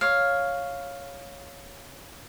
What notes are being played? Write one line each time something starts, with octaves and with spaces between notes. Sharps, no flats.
C#5 F5